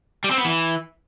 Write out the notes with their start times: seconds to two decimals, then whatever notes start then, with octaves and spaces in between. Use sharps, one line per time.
0.24 G3
0.31 C4
0.38 B3
0.45 E3